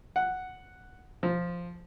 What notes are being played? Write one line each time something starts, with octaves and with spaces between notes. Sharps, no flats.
F#5
F3